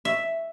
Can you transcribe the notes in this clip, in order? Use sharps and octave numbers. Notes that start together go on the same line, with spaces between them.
E5